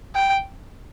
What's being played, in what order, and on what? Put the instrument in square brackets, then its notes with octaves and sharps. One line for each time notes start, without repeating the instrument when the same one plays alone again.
[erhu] G5